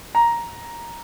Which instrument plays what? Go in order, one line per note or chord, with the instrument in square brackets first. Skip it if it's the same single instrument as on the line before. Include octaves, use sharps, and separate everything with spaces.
[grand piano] A#5